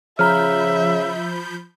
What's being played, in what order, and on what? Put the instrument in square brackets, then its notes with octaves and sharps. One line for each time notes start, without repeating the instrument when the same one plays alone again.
[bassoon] C#3 [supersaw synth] F3 B5 G6 [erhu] E5 [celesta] A#5 F6